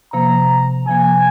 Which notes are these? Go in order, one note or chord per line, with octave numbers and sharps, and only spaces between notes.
C3 F3 A#3 A#5
C3 F3 A#3 G#5